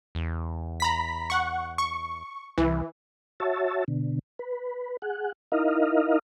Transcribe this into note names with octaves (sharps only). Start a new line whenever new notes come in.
E2
A#5 B5 B6
F#5 C#6
C#6
C2 E3
F#4 C#5 E5 A5
B2 D3
B4
G#4 F#5
D#4 E4 A#4 D#5 F5